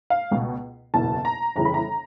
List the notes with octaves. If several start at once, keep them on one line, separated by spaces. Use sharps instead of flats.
F5
C#2 B2
F#1 E2 B2 A5
A#5
G1 F2 C#3 E3 A#5
B5
A#5